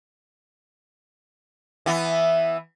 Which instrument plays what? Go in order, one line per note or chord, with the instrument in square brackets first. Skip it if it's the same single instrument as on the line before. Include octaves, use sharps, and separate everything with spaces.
[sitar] E3 B3